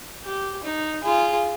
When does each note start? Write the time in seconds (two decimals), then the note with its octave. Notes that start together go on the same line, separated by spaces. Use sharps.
0.25 G4
0.64 D#4
1.03 F4 G#4